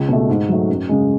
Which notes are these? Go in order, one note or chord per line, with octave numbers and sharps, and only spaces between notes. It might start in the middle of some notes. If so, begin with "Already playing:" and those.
Already playing: C#2
B2 A3
G#2
F#3 A3
F#2
C#3 G#3